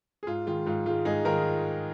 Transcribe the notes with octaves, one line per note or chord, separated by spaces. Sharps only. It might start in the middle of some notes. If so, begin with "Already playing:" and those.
G#4
G#2 F4
D#3 G#3 F4
G#2 F4
D#3 G#3 F4
G#2 D#4 G#4
D#3 F4 A#4